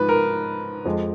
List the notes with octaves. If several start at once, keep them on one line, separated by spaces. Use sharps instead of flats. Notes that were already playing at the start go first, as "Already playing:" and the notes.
Already playing: G#2 F3 B4
A#4
F2 F3 G#3